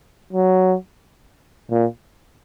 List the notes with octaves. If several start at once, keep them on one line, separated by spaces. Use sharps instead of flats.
F#3
A#2